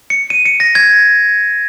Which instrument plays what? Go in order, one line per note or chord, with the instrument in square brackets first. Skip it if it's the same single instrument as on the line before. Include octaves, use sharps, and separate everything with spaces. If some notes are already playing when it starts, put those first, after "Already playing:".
[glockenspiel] C#7
D#7
C#7
A#6
G#6